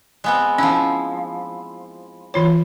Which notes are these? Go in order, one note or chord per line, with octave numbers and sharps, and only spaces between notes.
G#3 B3 C4
F3 C#4 E4
E3 F4 C#5